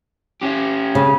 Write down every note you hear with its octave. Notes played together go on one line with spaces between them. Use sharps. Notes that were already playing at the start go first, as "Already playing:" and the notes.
C#4 G4
C#3